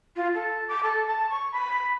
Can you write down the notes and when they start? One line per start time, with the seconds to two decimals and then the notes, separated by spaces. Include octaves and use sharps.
0.16 F4
0.35 A4
0.69 D6
0.83 A4
1.07 A5
1.30 C#6
1.52 B5